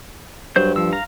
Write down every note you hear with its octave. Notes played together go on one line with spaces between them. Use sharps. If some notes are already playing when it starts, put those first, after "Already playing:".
G2 F#3 C5 G6
F3 E6
F5 A#5